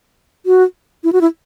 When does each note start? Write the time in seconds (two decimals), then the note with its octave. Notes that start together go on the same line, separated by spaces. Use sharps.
0.46 F#4
1.04 E4
1.13 F#4
1.21 E4